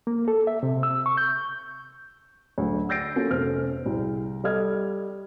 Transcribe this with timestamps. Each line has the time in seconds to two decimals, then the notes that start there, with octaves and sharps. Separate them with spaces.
0.07 A#3
0.28 A4
0.47 E5
0.63 C3
0.83 E6
1.06 C#6
1.17 G6
2.58 D2 F#3
2.89 E6 G6 A6 A#6 C7 D7
3.16 A#3 C#4 F4 F#4 A4 A#4
3.31 F1 B3 C#4 A4 C5 F6
3.86 C2 G#4
4.44 G3 A4 D#5 F6 G#6